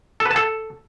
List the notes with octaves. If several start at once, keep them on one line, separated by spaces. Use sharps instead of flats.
A4
B4
A5
A4